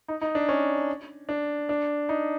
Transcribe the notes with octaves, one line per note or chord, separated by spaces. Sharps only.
D#4
D#4
D4
C#4
D4
D4
D#4